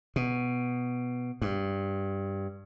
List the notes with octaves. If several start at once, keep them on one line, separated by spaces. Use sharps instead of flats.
B2
G2